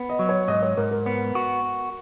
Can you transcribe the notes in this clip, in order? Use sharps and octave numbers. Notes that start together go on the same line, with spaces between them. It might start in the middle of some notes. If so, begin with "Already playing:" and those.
Already playing: B3
D#5
F#3
C#5
G#2 D#5
C#5
G#2 A#4
A#4
B3
F#4